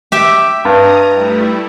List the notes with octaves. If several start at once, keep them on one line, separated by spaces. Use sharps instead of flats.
G4 E5 G5
G2 A#5 D#6
G3 A3 E4